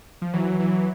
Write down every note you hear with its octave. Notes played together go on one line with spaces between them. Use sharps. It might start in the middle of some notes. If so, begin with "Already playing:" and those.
F3
E3 F#3
E3 F#3